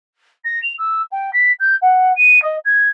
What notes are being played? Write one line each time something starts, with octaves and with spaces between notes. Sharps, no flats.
A#6
F7
E6
G5
B6
G6
F#5
D#7
D#5
G#6